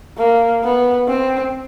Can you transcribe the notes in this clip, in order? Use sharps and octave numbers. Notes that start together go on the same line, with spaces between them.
A#3
B3
C4